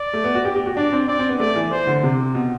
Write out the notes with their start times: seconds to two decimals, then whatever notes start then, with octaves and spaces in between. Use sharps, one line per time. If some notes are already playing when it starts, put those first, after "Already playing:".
Already playing: D5
0.13 A3
0.24 B3
0.35 F#4
0.45 G4
0.56 G4
0.66 F#4
0.77 D4 D5
0.93 C4
1.08 C4 D5
1.19 C4
1.29 B3
1.40 A3 D5
1.56 E3
1.71 E3 C5
1.87 D3
2.03 C3
2.35 B2